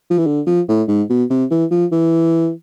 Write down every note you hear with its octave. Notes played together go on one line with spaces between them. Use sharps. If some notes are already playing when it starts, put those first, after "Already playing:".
F3
E3
D3
F3
A2
G#2
B2
C3
E3
F3
E3